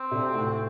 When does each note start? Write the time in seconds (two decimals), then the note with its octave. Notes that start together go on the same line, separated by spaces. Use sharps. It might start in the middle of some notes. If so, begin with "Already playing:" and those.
Already playing: C4
0.11 D2 C3
0.34 A2